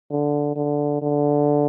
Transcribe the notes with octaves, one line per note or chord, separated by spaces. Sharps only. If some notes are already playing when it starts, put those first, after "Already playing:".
D3
D3
D3